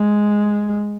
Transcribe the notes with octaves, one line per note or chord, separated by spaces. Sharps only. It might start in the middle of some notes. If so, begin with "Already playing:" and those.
Already playing: G#3